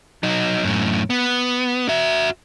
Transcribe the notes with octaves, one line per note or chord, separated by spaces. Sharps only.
F#3 D#4
F#2 A2
B3
F#4 E5